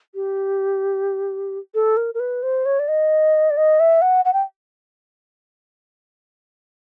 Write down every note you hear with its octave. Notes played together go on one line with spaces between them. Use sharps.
G4
A4
A#4
A#4
B4
C5
C#5
D5
D#5
D5
D#5
E5
F#5
F#5
G5